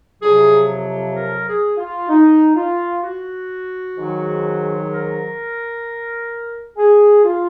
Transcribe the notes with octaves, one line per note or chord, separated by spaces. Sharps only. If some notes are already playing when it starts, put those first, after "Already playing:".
F2 C3 F#3 G#4
A#4
G#4
F4
D#4
F4
F#4
G#2 D#3 F#3
A#4
G#4
F4